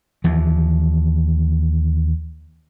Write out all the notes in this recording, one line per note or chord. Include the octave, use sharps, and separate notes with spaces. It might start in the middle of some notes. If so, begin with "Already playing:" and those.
D#2 E3 F3